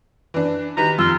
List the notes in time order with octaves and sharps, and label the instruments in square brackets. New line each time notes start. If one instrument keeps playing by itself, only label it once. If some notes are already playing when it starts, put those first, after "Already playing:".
[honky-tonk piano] E3 D4
[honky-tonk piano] D#3 G4 B4 [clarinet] A#5
[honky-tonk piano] F2 E6 [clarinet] F4